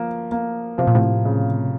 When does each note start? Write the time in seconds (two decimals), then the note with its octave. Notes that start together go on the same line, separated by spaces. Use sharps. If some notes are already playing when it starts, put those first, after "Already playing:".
Already playing: F3 A#3
0.31 A#3
0.78 C3 F3
0.87 A#2
0.95 A2 C3
1.25 C#3